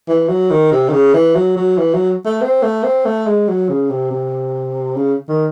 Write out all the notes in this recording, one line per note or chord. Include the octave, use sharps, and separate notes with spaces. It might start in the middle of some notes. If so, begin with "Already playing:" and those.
E3
F#3
D#3
C3
D#3
C#3
E3
F#3
F#3
E3
F#3
A3
C4
A3
C4
A3
G#3
F#3
C#3
C3
C3
C#3
D#3